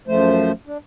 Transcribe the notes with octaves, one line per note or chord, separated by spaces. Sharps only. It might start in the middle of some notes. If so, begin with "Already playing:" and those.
F#2 F3 A3 C5
D4